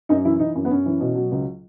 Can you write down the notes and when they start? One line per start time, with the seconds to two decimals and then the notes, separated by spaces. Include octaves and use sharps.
0.09 F#2 D#4
0.25 E3 E4
0.40 E3 D#4
0.55 F#2
0.65 B3
0.71 F#2 C#4
0.86 E3
1.00 B2
1.16 F#3
1.32 C#2